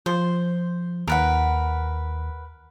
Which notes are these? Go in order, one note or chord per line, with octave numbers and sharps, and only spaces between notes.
F3 C5
D#2 A#4 B4 F#5